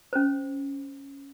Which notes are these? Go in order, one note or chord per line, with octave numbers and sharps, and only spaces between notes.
C#4 C5